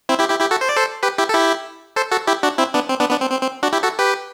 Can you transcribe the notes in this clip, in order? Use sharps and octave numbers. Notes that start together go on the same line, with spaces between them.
C4 E4
E4 G4
E4 G4
E4 G4
F#4 A4
C5
D5
A4 C5
G4 B4
E4 G4
A4
E4 G4
A4 C5
F#4 A4
E4 G4
D4 F#4
C4 E4
B3 D4
C4
B3 D4
B3 D4
C4
C4
C4
D4 F#4
E4 G4
F#4 A4
G4 B4